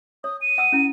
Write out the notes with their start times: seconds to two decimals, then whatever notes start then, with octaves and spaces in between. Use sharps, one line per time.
0.24 C#5 D#6
0.41 D#7
0.58 F#5 D#6 E6
0.72 C#4 E4